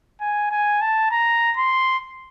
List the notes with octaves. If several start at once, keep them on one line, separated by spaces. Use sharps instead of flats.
G#5
G#5
A5
A#5
C6